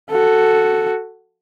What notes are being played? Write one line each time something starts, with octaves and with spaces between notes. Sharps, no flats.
F#4 A4